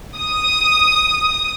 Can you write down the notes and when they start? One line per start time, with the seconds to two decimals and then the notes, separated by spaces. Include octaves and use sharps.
0.16 D#6